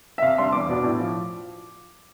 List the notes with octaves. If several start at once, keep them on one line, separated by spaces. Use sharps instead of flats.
E5
C3 F5
G3 D4 C6
E2 D6
B2 B3 D4
A2
F3